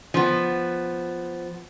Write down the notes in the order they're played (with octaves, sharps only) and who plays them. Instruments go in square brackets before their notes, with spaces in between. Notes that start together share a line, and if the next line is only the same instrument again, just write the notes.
[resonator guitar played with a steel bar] F3 B3